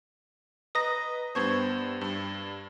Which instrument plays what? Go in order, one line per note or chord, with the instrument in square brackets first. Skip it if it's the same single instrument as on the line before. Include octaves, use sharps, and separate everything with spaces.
[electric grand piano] B4 D#5 A#5 [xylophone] D#6 A#6
[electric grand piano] G2 B3 C5 [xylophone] A5 C#6 G#6
[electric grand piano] G2